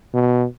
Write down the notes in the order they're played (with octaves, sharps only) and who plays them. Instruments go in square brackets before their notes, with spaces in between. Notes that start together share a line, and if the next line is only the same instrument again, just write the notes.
[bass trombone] B2